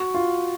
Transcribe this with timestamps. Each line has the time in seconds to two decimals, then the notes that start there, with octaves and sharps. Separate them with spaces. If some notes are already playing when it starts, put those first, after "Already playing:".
Already playing: F#4
0.14 F4